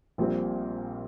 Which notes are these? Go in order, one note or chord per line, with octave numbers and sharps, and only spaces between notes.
A#1 A#2 G3 C4